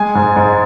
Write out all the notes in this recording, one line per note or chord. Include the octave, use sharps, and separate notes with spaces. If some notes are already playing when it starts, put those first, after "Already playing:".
Already playing: G#3 G#5
G#2
G#2